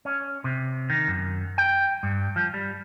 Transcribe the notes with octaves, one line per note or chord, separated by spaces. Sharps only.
C#4
C3
D#3
F#2
G5
G2
F3
G3